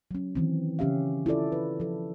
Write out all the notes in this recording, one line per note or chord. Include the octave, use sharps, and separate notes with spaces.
F#3 C#4
D#3 E3 C4
C#3 E3 C#4 G4 E5 F5
E4 F4 A4 D5
B4
F3 A4